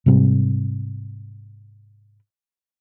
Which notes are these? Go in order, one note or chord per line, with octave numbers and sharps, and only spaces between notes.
G#2 C3 G3 C4